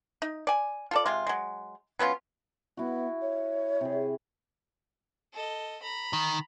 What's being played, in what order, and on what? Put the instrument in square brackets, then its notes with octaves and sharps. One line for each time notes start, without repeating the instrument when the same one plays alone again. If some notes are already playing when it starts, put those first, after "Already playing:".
[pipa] D#4
D5 G#5
F4 A4 D5
C3 G#3 F4
F#3 G#3
F#3 B3 C#4 F4
[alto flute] B3 [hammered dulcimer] E4 F#4
[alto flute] C#5
[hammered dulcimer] C3 G#4
[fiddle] A4 D#5
A#5 B5
[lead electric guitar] D#3